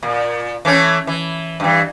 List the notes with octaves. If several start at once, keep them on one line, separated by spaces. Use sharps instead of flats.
A#2
E3 A3 C#4
E3
G2 E3